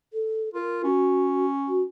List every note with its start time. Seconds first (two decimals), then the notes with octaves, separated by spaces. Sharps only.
0.13 A4
0.54 F4 A#4
0.84 C#4 F#4
1.68 F#4